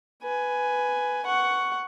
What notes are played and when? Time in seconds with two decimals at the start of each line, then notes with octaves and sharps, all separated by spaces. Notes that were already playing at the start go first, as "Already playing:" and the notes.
0.23 B4 G#5
1.25 F#5 C#6